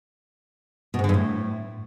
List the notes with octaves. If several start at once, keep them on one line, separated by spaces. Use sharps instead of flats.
B2
G#2
D3
G2
A2